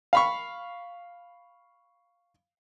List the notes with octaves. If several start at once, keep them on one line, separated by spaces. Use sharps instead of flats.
F5 B5 C#6